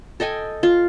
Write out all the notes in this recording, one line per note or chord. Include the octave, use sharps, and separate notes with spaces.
A4 D#5 G5 G#5
F4